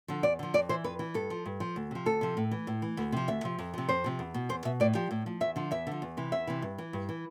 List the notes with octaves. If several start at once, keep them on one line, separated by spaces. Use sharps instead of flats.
D3 F3
E2 D5
D3 F3
F2 D5
E3 C5
F2 B4
E3
G2 A4
F3
G2
F3
D2
C3 F3
D2 A4
C3 F3
A2
E3
A2
E3
D2
C3 F3
D2 E5
C3 F3
F2
C3 F3
F2 C5
C3 F3
E2
B2
E2 C5
B2 E5
A2 D5
F3 G4
A2
F3
E2 E5
D3 F3
E2 E5
D3 F3
E2
C3 E3
E2 E5
C3 E3
G2
E3
G2
E3